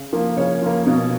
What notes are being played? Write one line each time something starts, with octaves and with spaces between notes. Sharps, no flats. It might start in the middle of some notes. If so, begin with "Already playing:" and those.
Already playing: C#3
F3 A#3
C#3 C#5
F3 A#3
B2